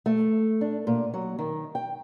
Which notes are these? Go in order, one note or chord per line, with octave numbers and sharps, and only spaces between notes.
A3
D4
A#2
F#3
D#3
G5